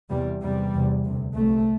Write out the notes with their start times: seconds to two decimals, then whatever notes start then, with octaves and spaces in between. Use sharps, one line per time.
0.10 E2 C3 G3
0.42 E2 C3 G3
0.74 E2 C3
1.05 D2 C3
1.36 C2 C3 A3